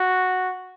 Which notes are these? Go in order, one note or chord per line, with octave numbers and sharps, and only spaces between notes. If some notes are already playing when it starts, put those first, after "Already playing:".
Already playing: F#4